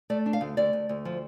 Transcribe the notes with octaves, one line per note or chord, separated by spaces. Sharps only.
A3 D5
D4
F5
D2
D2 D5
D2
D2
F3